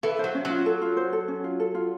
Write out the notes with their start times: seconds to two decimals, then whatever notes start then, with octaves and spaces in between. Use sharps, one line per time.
0.03 E3 A4
0.19 F#3 C5
0.35 C#4
0.45 F#3
0.50 F4
0.66 A4
0.82 F4
0.97 C5
1.13 A4
1.28 C#4
1.44 F4
1.60 A4
1.75 F4